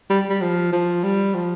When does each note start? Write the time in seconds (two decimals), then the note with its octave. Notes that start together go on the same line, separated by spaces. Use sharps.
0.10 G3
0.30 G3
0.41 F3
0.72 F3
1.03 G3
1.34 F3